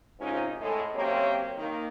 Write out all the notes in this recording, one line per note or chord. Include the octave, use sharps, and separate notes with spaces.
G#2 C3 C#4 D#4 F4 A#4
A2 G#3 A4
F#2 A#3 C4 G4 C#5
D#3 A#3